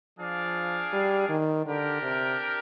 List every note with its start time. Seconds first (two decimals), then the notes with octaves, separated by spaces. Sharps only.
0.19 F3 D4 G#4 D5 F5
0.93 G3
1.29 D#3
1.66 D3 D4 G4 A#4
2.03 C3